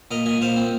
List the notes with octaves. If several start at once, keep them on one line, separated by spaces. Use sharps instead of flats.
A#2 A#4 D#5
A#2 D#5 G#5
A#2 C5 F5
C4